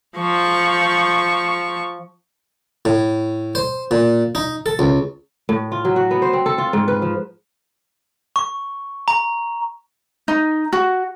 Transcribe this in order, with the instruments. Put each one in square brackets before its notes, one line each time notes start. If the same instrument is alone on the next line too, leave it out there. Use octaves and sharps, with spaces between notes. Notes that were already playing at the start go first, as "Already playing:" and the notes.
[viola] F3 C#6
[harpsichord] A2
C5
A#2
D#4
A4
C#2
[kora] A2
F4
F#3
F#4
B3
C5
C4
A4
F4
G#2
B4
F3
[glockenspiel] C#6
A#5
[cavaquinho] D#4
F#4